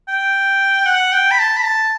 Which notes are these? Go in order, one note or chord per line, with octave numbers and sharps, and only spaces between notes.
G5
F#5
G5
B5
A5
B5
A5